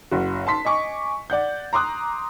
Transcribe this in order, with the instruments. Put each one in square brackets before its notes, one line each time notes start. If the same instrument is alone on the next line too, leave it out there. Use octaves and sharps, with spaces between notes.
[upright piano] F#1 F#4
A5 C6 B6
D#5 G#5 C#6 D6
D5 F#5 G6
A#5 C6 D6 D#6 F#6